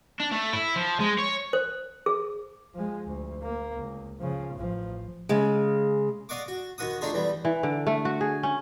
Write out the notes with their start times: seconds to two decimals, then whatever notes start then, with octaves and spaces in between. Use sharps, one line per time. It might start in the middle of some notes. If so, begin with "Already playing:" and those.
0.20 D4
0.31 A3
0.53 E4
0.76 F3
1.00 G#3
1.18 C#5
1.53 C5
2.06 G#4
2.74 F3 G#3
3.06 D2
3.42 A#3
3.75 C#2
4.19 C#3 F3
4.54 A1 F3
5.29 C#3 G#3
6.29 D5 D#5 F5 F#5 C#6 D6
6.48 F#4
6.78 D#2 F#4 F#5 D#6
7.01 A3 D4 D#4 F4 G#4
7.13 E2 E3 G3
7.45 E3
7.63 D3
7.87 A3
8.05 F#4
8.21 G#4
8.43 C#4